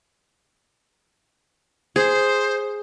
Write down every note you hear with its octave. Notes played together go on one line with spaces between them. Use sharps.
G#4 C5